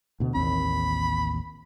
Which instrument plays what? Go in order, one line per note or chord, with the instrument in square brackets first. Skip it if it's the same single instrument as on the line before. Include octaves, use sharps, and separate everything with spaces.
[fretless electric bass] D2 B2
[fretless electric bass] A1 D#2 C4 [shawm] B5